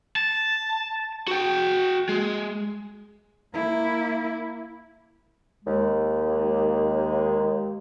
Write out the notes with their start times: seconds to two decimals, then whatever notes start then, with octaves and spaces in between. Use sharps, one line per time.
0.16 A5
1.28 F#4 G5
2.09 G#3
3.54 A#3 E4
5.65 D#2 G#3